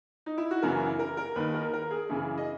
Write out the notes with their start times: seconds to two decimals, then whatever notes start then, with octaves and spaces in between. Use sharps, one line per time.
0.26 D#4
0.38 E4
0.51 F#4
0.62 F#2 C#3 E3 A#4
0.99 A#4
1.17 A#4
1.36 D#2 D#3 B4
1.54 A#4
1.73 A#4
1.91 G#4
2.09 F#2 C#3 E3 G#4
2.38 D#5